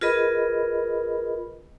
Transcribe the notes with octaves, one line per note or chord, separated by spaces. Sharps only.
F4 G#4 A#4 B4 D#5 B5